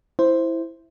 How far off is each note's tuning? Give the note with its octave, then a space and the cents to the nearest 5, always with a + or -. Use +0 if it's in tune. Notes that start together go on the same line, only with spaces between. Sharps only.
E4 +0 C5 +0